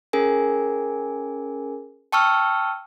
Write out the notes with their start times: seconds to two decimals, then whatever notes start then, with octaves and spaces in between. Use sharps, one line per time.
0.13 C#4 G#4 A#4 G#5
2.12 G5 A5 C#6 E6 F6